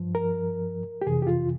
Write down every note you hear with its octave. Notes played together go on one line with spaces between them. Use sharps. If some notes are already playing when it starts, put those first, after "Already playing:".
Already playing: G2 F3
A#4
G4
F2 C3 E3 G#4
G4
F4